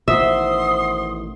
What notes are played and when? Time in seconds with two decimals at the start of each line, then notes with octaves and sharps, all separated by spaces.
0.08 A1 B2 D#3 C5 E5 F#5 C6 D#6